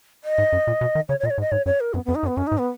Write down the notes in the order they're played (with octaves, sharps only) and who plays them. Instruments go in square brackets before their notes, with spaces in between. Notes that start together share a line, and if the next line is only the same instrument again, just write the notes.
[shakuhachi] D#5
[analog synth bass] G#2
F#2
A#2
B2
D#3
[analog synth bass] C#3 [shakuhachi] C#5
[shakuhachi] C#5
[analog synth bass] A#2 [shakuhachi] D#5
[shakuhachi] C#5
[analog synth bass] G#2
[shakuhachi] D#5
[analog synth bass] G#2 [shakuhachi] C#5
[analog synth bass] F#2 [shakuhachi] C#5
[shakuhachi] A#4
[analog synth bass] F#2 [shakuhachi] B3
[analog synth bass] F2 [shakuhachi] B3
[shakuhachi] D#4
[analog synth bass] F#2
[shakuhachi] B3
[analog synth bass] F#2 [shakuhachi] C#4
[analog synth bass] G#2 [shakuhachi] D#4
[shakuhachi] B3